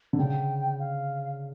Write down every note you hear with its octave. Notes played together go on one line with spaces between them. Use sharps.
D3
C#3 G5
F5